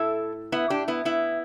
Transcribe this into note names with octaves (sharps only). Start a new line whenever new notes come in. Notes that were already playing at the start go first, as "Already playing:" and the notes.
Already playing: A2 E4 A4
B3 E4
D4 G4
B3 E4
B3 E4